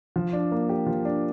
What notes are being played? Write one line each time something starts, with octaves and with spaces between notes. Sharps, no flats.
F3
D4
A#3
G4
F3
D4